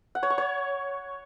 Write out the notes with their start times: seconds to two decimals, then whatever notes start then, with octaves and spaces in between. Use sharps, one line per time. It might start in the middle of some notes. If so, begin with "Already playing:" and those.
0.15 F#5
0.23 C#5
0.30 C#6
0.38 C#5